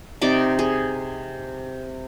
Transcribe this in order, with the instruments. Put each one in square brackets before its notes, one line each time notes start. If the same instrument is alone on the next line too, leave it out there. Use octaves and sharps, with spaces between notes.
[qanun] C3 D#4 D5 D6
G#4